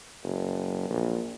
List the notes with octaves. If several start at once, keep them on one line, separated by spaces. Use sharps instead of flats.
F#1
A#1